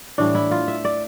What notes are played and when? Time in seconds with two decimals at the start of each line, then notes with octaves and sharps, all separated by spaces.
0.18 A2 E3 G3 D4
0.35 E4
0.51 F4
0.68 E5
0.85 D5